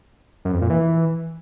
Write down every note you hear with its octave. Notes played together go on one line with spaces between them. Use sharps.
F#2
F2
A#2
E3